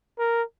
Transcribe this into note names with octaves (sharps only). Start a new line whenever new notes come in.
A#4